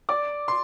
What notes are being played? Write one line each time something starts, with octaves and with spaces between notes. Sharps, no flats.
D5 D6
C6